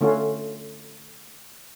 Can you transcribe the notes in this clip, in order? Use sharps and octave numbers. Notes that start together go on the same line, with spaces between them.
D3 A3 C#4 F4 F#4